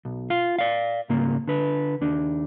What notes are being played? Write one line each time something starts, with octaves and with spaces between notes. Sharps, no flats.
B1
F4 F5
D5 F5
G#2 C#3 A#3
D3 B4
D#2 D4